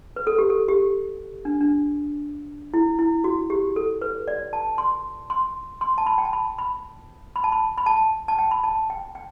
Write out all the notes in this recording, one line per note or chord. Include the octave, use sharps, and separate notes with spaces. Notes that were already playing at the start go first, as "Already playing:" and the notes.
B4
A4
G4
A4
G4
D4
D4
E4
E4
F#4
G4
A4
B4
D5
A5
C6
C6
C6
A5
B5
G5
A5
B5
B5
B5
A5
B5
B5
A5
A5
G5
B5
A5
G5
G5